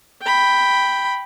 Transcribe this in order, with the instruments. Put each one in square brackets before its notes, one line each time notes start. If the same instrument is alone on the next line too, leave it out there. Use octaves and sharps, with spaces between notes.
[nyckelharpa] G5 B5